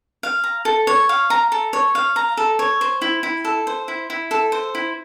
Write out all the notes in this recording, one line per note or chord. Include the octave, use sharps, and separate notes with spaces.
F5
A#5
A4
C#5
F5
A#5
A4
C#5
F5
A#5
A4
C#5
C5
E4
E4
A4
C5
E4
E4
A4
C5
E4